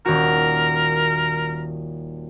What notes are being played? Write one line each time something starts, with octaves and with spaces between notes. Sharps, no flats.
D#1 F#4 A#4